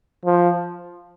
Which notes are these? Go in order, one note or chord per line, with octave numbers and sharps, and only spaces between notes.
F3